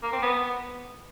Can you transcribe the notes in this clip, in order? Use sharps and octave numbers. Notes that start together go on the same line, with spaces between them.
A#3
C4
B3